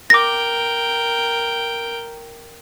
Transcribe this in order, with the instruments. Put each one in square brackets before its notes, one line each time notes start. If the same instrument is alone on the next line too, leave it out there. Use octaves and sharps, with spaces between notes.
[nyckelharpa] A#4 G5 [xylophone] D6 A#6